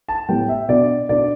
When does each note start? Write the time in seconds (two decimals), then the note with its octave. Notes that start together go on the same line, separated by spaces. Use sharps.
0.09 A5
0.29 A2 G3 B3 G5
0.48 E5
0.68 B2 B3 D4 D5
1.09 B2 B3 D4 D5